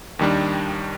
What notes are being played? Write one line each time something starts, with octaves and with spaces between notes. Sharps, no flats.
D#2 D#3 G3 D4